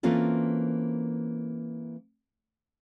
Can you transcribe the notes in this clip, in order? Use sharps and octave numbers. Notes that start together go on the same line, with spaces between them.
E3 A#3 C4 C#4 F4 A4